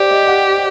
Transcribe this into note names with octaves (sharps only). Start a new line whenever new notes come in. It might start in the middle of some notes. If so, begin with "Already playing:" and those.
Already playing: G4 C5 D5
D#5
F#5